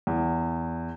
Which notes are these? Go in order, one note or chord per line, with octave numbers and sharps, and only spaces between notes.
E2